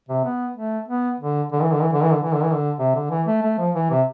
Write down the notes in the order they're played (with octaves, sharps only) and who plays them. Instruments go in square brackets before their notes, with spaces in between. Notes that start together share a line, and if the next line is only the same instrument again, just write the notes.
[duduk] C3
B3
A3
B3
D3
D3
E3
D3
E3
D3
E3
D3
E3
D3
E3
D3
C3
D3
E3
A3
A3
F3
E3
C3